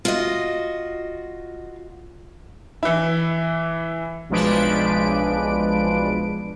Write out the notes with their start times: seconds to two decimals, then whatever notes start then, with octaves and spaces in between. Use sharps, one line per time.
0.05 F4 F#4 D#5
2.83 E3 E4
4.30 B1 F3 G#3 D4 B4 D7